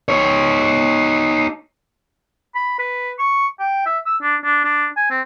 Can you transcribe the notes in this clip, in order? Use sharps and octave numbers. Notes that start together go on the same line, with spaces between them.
D#4 C#5
B5
B4
C#6
G5
E5
E6
D4
D4
D4
G#5
C4